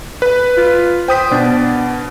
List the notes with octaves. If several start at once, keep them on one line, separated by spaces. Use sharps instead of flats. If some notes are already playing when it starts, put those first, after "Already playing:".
B4
F4
C5 G5 D#6 B6
B2 D4